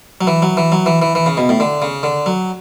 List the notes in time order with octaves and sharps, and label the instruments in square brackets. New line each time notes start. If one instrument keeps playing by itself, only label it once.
[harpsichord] F#3
E3
F#3
E3
F#3
E3
E3
E3
C#3
B2
A2
D3
C#3
D3
F#3